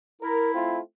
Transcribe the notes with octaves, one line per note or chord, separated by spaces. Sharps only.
E4 A#4
A3 C4 F4